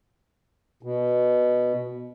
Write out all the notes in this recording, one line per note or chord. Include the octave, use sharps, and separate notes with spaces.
B2